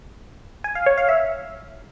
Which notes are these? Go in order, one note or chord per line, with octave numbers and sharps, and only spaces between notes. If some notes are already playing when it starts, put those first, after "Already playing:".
G#5
F5
C#5
F5
E5